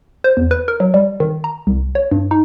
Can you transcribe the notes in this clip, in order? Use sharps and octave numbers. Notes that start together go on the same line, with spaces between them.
C5
E2
B4
A#4
F#3
G3
D#3
A#5
C2
C#5
G2
D#4